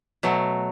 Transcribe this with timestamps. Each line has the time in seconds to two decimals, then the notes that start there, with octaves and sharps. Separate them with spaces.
0.23 B2 F#3 A3